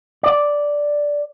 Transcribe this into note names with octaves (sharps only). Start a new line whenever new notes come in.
D5